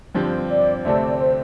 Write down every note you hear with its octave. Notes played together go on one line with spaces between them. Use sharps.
G2 D3 F3 C4 G4 C5
D5
D2 C3 A3 C4 A4 D5
D5
C5